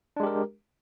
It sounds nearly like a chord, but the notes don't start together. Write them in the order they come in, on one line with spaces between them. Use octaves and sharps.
D4 G#3 G4 A#4